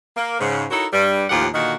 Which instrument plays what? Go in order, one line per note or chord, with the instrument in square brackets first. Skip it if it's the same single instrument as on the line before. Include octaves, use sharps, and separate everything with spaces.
[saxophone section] A#3
G#2 C#3
D#4 E4 F#4 A4 A#4 C#5
G2 G3
D#2 A2 F3 F4 G4 F#5
A#2 D3 D#3 A#3 D#4 F#4